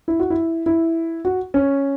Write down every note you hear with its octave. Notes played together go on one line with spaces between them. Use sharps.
E4
F#4
E4
E4
F#4
C#4